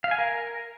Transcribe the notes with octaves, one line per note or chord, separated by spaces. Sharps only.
F5
G#5
A#4